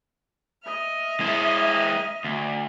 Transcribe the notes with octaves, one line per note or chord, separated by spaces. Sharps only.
D#5 E5 F6
G#3 E4
D2